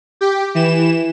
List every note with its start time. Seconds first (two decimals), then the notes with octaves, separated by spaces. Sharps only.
0.21 G4
0.55 E3 E7